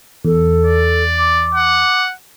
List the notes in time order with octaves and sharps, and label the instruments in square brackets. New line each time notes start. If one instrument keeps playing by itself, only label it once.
[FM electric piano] E2 [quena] A4
[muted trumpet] D5
[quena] D6
[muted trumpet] F#5